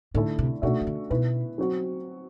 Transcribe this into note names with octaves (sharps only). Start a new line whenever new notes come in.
A2 D3 A3 E4 A4
C3
B2 A3 D4 F#4 A4 E5
E3
D3
B2 B3 E4 B4
F#3 C4 F#4